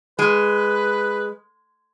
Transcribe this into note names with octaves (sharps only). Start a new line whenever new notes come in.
G#3 B4